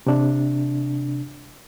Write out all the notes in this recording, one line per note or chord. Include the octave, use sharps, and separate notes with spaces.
C3 D4